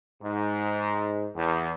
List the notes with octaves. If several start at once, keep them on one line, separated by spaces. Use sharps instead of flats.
G#2
E2